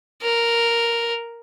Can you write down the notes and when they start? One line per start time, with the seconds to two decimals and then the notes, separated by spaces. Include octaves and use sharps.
0.22 A#4